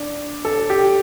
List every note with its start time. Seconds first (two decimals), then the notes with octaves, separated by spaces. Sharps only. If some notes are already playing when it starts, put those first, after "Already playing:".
Already playing: D4
0.45 A4
0.70 G4